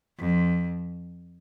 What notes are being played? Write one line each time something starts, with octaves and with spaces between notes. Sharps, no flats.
F2